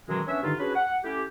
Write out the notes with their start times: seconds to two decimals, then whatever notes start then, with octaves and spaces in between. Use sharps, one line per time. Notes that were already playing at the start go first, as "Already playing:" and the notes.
0.09 F#2 B2 D#3 E3 F#3 G#3
0.27 B3 C#4 D4 C#5 E5
0.43 G2 D3 D#3 D#4 F4
0.59 C#4 D4 F#4 G#4 B4
0.75 F#5
1.04 A3 C#4 E4 G4